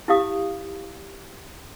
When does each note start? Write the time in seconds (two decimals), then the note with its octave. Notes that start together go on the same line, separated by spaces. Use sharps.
0.08 E4 G4 F5 D#6